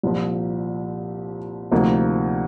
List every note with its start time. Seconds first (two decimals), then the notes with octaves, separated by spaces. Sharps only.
0.03 C2 A#2 F3
1.71 D2 C3 F3 A#3 D#4